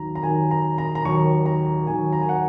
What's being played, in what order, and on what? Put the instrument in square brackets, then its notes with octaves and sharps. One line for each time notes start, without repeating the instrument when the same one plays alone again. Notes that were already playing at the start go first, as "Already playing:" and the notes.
Already playing: [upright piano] D#2 D#3 F#3 A#5
A#5
D#2 D#3 F#3 G#5
A#5
A#5
A#5
D#2 D#3 F#3 C#6
A#5
D#2 D#3 F#3 G#5
A#5
G#5
F#5